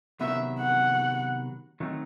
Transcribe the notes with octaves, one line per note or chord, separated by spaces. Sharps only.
C3 D#3 F#3 B3 E5
F#5
D#3 F#3 A3 C4 D#4